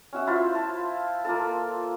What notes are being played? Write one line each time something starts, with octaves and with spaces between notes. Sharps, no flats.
C#4 F#4 E5
E4 F4 C5
A5
A#3 F4 A4